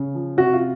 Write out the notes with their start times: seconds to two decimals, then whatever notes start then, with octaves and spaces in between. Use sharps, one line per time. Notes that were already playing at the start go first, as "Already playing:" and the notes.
Already playing: C#3
0.15 F3
0.37 C3 F#4
0.53 F4